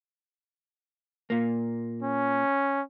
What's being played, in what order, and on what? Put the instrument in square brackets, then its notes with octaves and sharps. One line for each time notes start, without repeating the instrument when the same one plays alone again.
[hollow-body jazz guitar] A#2 A#3
[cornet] C#4